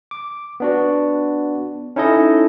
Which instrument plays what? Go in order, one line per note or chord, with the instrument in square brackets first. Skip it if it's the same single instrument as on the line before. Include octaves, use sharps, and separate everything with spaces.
[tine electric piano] D6
B3 D4 F#4
C#4 D#4 E4 A4 D#5